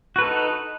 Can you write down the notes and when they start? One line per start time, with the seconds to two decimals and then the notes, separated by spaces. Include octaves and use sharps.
0.16 F#4
0.19 B4
0.21 A4
0.24 D#4